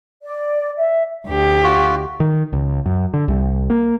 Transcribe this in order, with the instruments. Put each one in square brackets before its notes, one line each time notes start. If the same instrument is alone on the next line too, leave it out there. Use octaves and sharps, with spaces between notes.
[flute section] D5
E5
[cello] D2 G4
[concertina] F4 F#4
[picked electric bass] D#3
C#2
F#2
D3
C2
A#3